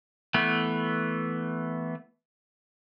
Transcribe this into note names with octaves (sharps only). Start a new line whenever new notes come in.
E3 A3 B3